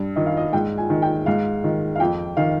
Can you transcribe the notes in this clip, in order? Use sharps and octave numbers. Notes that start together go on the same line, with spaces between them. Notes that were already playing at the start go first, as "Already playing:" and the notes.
Already playing: G2
D#3 D#5
F5
D#5
G#2 G5
G#5
D#3
G5
G#2 F5
D#3
F5
F2 G5
D#3 F5